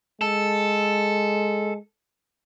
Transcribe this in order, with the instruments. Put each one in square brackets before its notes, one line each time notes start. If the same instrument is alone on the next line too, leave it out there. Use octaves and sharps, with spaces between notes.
[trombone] G#3 [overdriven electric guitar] A4